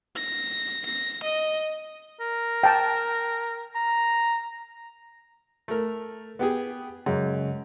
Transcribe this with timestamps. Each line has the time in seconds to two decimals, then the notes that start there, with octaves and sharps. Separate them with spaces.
0.16 A#6
0.85 A#6
1.23 D#5
2.20 A#4
2.63 G5 A5
3.75 A#5
5.68 A3 A#4
6.39 B3 G4 G#4
7.06 F#2 C#3 G#3